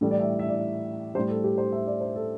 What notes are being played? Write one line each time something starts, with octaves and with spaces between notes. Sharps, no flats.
A2 E3 G3 A4
D5
E5
E5
D5
A2 G3 C5
A4
G4
C5
E5
D5
C5
A4